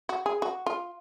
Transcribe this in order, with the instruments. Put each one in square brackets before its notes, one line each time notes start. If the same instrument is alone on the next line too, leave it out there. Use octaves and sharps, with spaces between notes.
[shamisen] F#4
G#4
F#4
F4